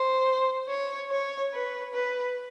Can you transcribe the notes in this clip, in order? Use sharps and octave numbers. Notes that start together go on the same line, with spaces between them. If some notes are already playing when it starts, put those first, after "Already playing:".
Already playing: C5
C#5
C#5
B4
B4